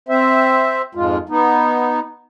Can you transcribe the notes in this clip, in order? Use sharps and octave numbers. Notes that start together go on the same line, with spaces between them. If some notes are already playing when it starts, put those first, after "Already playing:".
C4 C5 E5
F2 G#2 G#3 F4
B3 D#4